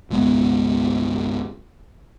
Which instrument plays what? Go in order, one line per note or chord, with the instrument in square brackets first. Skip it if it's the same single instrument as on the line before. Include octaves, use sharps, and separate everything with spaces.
[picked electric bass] G1 C2 G#3 B3